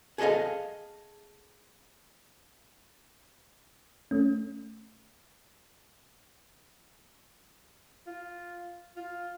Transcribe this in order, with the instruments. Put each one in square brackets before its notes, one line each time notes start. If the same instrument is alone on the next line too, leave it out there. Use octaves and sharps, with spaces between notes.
[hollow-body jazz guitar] G#4 A4 B4 D#5 F5
[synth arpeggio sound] A3 C#4
[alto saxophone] F4
F4